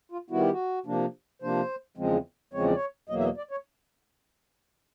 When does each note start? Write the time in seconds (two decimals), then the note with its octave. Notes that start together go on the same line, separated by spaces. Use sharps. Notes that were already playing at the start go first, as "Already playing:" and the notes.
0.12 F4
0.30 D#3 G3 B3 E4 F#4
0.41 G4
0.52 F#4
0.86 C3 F3 A#3 D4
1.42 C3 F3 A#3 D4 C5
1.97 E2 C#3 F3 G#3 C4
2.54 E2 C#3 F3 G#3 C4 C#5
2.65 D5
2.75 C#5
3.09 E2 B2 F#3 A#3 D#5
3.19 E5
3.24 D#5
3.37 D5
3.51 C#5